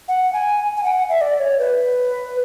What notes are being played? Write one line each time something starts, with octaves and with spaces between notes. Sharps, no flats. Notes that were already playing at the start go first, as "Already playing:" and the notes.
F#5
G#5
G#5
F#5
E5
D5
C#5
B4